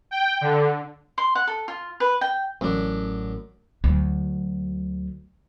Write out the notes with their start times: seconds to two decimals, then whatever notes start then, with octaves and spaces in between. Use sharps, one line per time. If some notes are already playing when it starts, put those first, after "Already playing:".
0.11 G5
0.41 D3
1.18 C6
1.35 F#5
1.47 A4
1.68 F4
2.00 B4
2.21 G5
2.61 A1 F#2 E3 A3 D4
3.84 D2 F#3